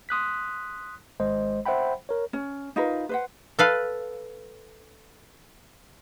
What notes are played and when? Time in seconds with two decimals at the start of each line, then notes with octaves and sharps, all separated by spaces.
0.09 C6 D#6 F#6 B6
1.20 G#1 G#3 C5 D#5
1.66 C5 E5 F#5 G5 B5
2.09 A#4 C#5
2.33 C#4
2.76 D#4 F4 A#4 B4
3.09 B4 C5 F#5
3.59 A4 B4 F5